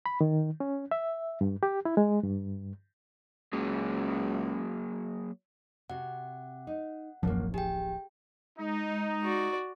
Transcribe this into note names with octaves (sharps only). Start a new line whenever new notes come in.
B5
D#3
C#4
E5
G2
G4
E4
G#3
G2
C#2 F#3 A#3 G#4
C3 F#4 F#5
D#4
D1 A1 F#2 F3 A#3
G4 G#4 G5
G#3 D#4
F#4 D5